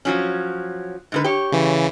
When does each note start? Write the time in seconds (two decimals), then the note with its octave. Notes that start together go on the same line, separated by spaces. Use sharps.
0.05 F3 F#3 C#4
1.12 G#2 D3 B4
1.24 G4 C#5
1.52 C#3 E3